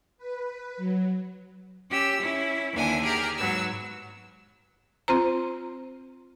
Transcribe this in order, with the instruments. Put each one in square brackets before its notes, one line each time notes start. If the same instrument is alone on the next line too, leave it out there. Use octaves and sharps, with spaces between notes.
[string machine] B4
F#3
[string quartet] C#4 G4 E6
C#4 E4
D#2 D3 E3 D4 E4 G#5
G4 G#4 G5 A#5 F6
G#2 F#3 B3 E6
[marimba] C4 F4 C5 A#5